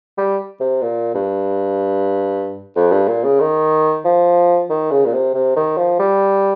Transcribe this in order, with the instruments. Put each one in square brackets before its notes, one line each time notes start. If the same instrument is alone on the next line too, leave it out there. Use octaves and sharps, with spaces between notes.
[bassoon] G3
C3
A#2
G2
F2
G2
A#2
C#3
D#3
F3
D#3
C#3
A#2
C3
C3
D#3
F3
G3